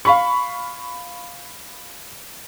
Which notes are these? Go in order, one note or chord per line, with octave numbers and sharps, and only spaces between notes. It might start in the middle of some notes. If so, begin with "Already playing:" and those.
F5 B5 C#6